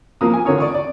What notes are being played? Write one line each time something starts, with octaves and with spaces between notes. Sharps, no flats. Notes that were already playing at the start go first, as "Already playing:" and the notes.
F3 A#3 D#6
G#5
D3 F4 A#4 C#5 C#6 D#6
D5 C#6 D#6
D5